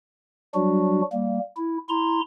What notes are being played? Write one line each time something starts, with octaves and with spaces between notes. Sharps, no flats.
F#3 G3 D4 F#4
G3 A#3
E4
E4 A#5 C6